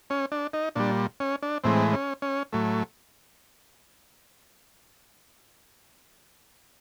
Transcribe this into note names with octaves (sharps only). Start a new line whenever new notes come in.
C#4
D4
D#4
A#2 G3 D4
C#4
D4
A2 E3 G#3 C4
C#4
C#4
A2 F#3 A3